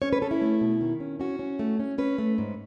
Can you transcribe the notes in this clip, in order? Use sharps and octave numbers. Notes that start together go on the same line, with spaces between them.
C#4 C#5
B4
C#4 A4
E4
A3
B2
D#3
C#4
C#4 F#4
C#4
A3
C#4
C#4 B4
A3
G#2